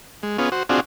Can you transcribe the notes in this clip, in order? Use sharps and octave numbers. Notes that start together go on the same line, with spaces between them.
G#3
B3 C#4 F4 G#4
F#4 C5
C4 D4 F4 F#4 G#4